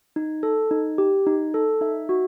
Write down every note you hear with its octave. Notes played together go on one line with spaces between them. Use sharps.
D#4
A4
D#4
G4
D#4
A4
D#4 E5
F#4